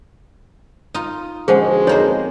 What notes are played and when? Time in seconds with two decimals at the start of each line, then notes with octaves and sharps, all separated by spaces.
0.94 D#4 F4
1.48 B2 D3 F3 G#3 C#4 G#4 C5 F#5
1.87 F2 A#3 D#4 C5 C#5